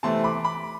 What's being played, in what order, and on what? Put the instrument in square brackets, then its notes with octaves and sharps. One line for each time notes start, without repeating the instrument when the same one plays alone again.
[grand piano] C3 E3 A3 C4 A5 C6
B5 D6
B5 D6